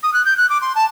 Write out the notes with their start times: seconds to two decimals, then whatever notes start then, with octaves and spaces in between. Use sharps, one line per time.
0.03 D#6
0.13 F#6
0.25 G6
0.37 F#6
0.49 D6
0.61 C6
0.75 A5